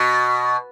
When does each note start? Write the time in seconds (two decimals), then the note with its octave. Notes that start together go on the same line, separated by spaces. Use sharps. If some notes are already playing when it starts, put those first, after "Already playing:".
Already playing: B2